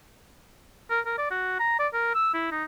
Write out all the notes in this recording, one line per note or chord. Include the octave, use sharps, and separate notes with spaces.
A#4
A#4
D5
F#4
A#5
D5
A#4
E6
E4
D#4